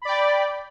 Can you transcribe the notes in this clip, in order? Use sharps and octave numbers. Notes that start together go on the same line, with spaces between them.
D5 G5 B5